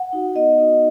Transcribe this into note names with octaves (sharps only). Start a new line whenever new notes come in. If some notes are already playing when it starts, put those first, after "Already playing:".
Already playing: F#5
D#4 F#4
B3 D#5
D#4 F#4